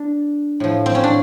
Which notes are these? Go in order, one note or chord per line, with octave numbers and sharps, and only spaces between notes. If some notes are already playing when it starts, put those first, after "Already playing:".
Already playing: D4
A2 F3
C4
C#4
D4